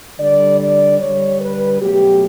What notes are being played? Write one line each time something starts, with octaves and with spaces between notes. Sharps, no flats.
D3 G3 D5
D5
D3 G3 C#5
B4
B2 F#3 A3 G4